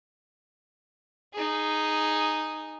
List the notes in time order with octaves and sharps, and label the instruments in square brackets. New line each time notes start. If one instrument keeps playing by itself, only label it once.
[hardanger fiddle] D#4 G#4